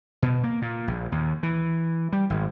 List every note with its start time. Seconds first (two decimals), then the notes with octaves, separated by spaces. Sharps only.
0.22 B2
0.43 A#3
0.62 A#2
0.88 A#1
1.12 D#2
1.43 E3
2.13 G3
2.30 G#1